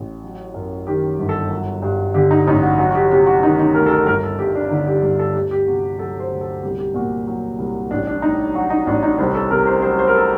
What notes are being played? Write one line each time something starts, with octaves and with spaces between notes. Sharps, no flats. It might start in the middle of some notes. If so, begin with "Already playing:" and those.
Already playing: A1
F#3
F#2
D#3 G4
G1
A4
F#3
G2
D3 G4
D#4
A1 D#4
F#4
F#3 F#4
F#4
G4
C3 G4
F#4
D#3 D#4
D#4
D2 A#4
A4
A#4
G1 A#4
A4
G2 G4
D4
D3 D#4
G4
G1 G4
A4
D2 G4
G4
C3 F#4
F#3 A4
C5
D2
A4
C2 G4
G4
A#2 F#4
F#3
C2
A1 D4
D4
A2 D#4
F#3 F#4
D#4
A1 D4
D#4
C2 C5
A4
C3 A#4
C5
F#3 C5
C5
A#4
A4